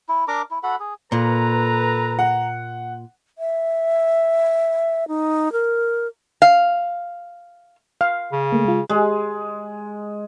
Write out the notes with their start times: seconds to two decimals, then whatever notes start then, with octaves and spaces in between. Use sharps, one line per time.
0.09 E4
0.28 D4 A#4 A#5 D6
0.51 E4
0.63 F#4 A4 F#5 B5
0.80 G#4
1.12 A#2 A4 B4 A#5
2.19 F#5
3.38 E5
5.08 D#4
5.52 A#4
6.42 F5
8.01 F5
8.32 C#3
8.52 A3 A#3
8.65 G#3 F4
8.90 G#3